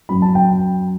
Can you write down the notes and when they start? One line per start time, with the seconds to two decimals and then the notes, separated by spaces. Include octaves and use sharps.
0.09 F#2 F#3 B5
0.22 A5
0.35 G5
0.49 A5